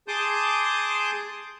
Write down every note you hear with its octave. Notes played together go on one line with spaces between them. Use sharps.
G#4 A5 C6 D6 D#6 G6